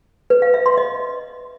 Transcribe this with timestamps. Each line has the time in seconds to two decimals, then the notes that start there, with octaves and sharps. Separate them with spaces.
0.30 B4
0.42 F5
0.54 E5
0.66 C6
0.77 D#5